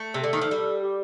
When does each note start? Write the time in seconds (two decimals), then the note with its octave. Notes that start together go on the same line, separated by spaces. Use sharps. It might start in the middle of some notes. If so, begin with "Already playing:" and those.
Already playing: A3
0.14 C3
0.20 D3 A4
0.33 D#3
0.41 F3
0.51 G3
0.82 G4